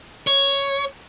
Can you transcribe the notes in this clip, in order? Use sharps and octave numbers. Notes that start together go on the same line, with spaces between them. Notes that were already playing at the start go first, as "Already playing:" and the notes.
C#5